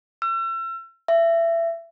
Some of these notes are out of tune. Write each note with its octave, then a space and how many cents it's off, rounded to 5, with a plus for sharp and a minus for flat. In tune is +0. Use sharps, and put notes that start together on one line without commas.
E6 +40
E5 +25